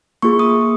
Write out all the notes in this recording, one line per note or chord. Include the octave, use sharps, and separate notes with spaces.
A#3 F4 G#4 C#6
D#6